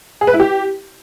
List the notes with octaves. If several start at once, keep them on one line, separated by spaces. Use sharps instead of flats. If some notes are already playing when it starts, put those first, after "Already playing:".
G#4
B4
E4
G4